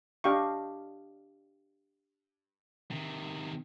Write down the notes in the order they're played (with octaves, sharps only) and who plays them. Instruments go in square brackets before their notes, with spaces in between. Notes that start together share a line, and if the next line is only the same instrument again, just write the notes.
[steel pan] D4 G4 D#5 F5 G5 C#6
[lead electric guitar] C3 D#3